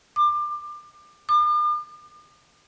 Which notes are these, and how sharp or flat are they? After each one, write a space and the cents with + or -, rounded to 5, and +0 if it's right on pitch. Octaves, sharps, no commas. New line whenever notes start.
D6 +25
D6 +45